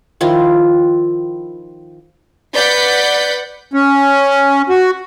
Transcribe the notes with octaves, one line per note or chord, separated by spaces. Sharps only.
D#3 F3 E4 F4
B4 D5 F#5 G6 B6
C#4
F#4